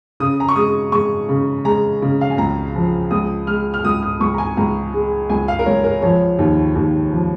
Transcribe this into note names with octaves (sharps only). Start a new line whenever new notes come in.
C#3 D#6
A#5
C#6
G#3 D#6
G#3 C#6
C#3
G#3 A#5
C#3
F5
G#5
C#2 A#5
F3
C#2 D#6
G#3 F6
F6
C#2 D#6
D#6
C#2 C#6
A#5
G#5
C#2 A#5
G#3
C#2 G#5
F5
A#4
C#2 C#5
A#4
F3 C#5
D#2
D#2
F3